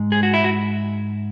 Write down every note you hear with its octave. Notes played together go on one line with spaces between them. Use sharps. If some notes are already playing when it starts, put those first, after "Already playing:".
Already playing: G#2 G#3
G#4
F#4
E4
F#4